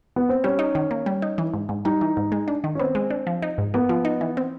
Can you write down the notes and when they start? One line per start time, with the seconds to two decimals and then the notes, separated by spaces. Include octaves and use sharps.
0.16 B3
0.29 C4
0.44 G3 C#4
0.59 D#4
0.75 D#3
0.91 A#3
1.06 G3
1.22 D#4
1.38 E3
1.54 G#2
1.69 G#2
1.85 G3 D#4
2.01 E3
2.17 G#2
2.32 G#3
2.48 D4
2.64 D#3
2.75 C#4
2.79 B3 C4
2.95 G#3
3.10 D4
3.27 F3
3.42 D#4
3.58 G#2
3.74 A#3 B3
3.89 F3
4.05 D#4
4.21 E3
4.37 C4